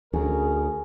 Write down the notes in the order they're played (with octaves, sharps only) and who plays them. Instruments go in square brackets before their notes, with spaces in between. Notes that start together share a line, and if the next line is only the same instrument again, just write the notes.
[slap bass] D2 [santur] C#4 [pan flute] G#4 [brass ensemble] A#4